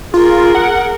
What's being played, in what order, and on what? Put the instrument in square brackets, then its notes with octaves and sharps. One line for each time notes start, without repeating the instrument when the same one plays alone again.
[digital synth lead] F4 [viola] G#4 A#4
[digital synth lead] F#5